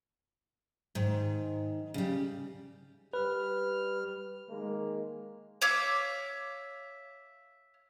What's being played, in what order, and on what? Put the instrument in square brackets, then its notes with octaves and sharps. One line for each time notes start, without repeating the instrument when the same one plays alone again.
[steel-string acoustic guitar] G#2 D#3
C#3 G3
[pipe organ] G3 F6 [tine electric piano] B4
[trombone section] D#3 G#3 A#3
[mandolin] C#5 E5 F5 D6